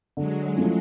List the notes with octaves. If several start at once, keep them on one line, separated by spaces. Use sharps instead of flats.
D3 F#3 G#3
F3 A3 C#4 E4